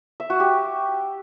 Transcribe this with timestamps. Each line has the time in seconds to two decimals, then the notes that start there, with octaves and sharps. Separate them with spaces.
0.20 E5
0.30 F#4
0.40 G4